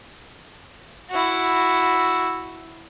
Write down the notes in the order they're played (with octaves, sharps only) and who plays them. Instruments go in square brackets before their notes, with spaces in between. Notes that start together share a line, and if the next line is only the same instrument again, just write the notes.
[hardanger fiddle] E4 F#4